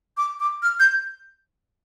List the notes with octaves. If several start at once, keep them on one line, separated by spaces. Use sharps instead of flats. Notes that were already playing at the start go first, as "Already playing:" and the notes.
D6
D6
F6
G6